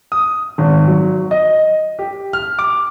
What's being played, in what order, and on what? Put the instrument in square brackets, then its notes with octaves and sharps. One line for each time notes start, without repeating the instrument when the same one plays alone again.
[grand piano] D#6
G#1
F#3
D#5
G4
F6
D6